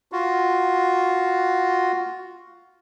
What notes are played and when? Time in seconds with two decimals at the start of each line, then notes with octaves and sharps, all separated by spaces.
0.12 F4 F#4